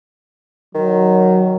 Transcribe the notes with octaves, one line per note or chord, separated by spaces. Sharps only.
D#3 F#3